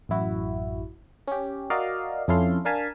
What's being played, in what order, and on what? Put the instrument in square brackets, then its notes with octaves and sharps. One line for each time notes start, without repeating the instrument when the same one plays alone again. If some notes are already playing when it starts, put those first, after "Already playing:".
[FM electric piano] A1 F#2 E4 F#4
C#4 G4
F#4 A#4 D5 D#5 F5
F2 C#4 E4 A4 F5 C6
D4 A#4 F5 G#5 A5 B6